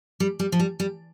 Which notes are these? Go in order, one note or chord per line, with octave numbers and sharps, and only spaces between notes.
G3
G3
F3
G3
G3